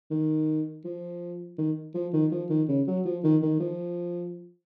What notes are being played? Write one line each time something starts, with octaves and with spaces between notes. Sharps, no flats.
D#3
F3
D#3
F3
D#3
F3
D#3
C#3
F#3
F3
D#3
D#3
F3